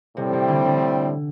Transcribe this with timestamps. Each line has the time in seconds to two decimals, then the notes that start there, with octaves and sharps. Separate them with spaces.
0.16 A2 C3 G3 C4
0.33 C3
0.48 D3
0.65 D3